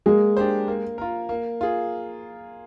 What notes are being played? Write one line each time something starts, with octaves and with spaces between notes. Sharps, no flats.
G#3 A#3
D4 G4 C5
A#3
F4 A#4
A#3
F4 G#4